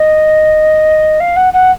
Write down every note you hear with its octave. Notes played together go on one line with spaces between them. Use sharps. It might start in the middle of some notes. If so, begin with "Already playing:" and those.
Already playing: D#5
F5
F#5
F#5